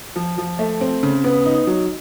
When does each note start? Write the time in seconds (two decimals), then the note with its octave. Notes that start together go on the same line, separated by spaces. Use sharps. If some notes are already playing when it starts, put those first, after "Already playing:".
0.16 F3
0.38 F3
0.59 A3
0.81 C4
1.03 C#3
1.24 B3
1.46 D#4
1.67 F#3